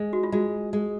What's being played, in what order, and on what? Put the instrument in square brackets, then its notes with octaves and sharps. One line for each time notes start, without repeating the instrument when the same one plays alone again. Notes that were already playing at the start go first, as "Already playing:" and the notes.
Already playing: [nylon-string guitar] G#3
[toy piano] F#4
F4
[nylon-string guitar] G#3 [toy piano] F#4
[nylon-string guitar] G#3